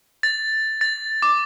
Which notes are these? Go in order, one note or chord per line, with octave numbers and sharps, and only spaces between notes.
A6
A6
D6